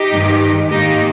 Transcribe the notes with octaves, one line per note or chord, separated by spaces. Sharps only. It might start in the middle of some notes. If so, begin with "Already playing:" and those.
Already playing: D#4 G4
G2 D#3 G#3
G#2 D#3 A#3 D#4 G4